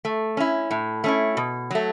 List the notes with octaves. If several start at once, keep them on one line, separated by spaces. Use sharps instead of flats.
A3
C#4 E4
A2
A3 C#4 E4
B2
F#3 A3